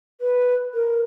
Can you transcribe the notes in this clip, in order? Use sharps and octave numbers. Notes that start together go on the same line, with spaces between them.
B4
A#4